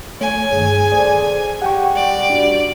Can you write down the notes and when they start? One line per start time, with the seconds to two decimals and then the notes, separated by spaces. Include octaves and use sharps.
0.21 A3 C#5 G#5
0.53 G2 D#3 G#4
0.92 A4 C5 D5
1.62 G4 F#5 G5 C#6
1.95 G3 D5
2.29 D4 F#4